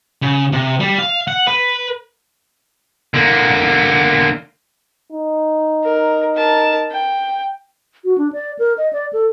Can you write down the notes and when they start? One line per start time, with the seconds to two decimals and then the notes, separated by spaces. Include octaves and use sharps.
0.22 C#3
0.52 C3
0.80 G3
0.99 F5
1.28 F#5
1.47 B4
3.14 D3 A#3
5.12 D#4
5.84 A#4
6.35 A#4 A5
6.91 G5
8.04 F#4
8.18 D4
8.33 D5
8.59 A#4
8.78 D#5
8.93 D5
9.13 A4